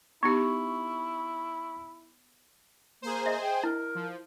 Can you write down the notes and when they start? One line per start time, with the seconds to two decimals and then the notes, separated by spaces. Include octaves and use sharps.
0.23 B3 D#4 E4 G4 C#6
3.02 A#3 G#4 C5
3.26 D#5 E5
3.41 G5
3.64 E4 A#4
3.95 F3